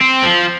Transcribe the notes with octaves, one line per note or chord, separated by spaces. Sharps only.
C4
F3